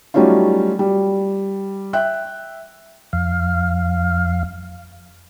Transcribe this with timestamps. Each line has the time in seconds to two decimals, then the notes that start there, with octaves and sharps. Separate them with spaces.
0.14 F#3 G3 A3 C#4 D#4 F4
0.79 G3
1.93 E5 G5 F#6
3.13 F2 F5